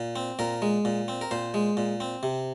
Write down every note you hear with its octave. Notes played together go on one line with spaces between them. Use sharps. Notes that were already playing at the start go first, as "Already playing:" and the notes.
Already playing: A#2
C4
A#2 A#4
G#3
A#2
C4
A#4
A#2 C5
G#3
A#2
C4
C3